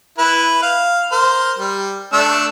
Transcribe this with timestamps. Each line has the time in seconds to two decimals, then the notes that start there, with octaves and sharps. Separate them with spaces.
0.18 E4 B4
0.62 F5
1.12 A#4 C5
1.58 G3
2.13 A3 D4 E6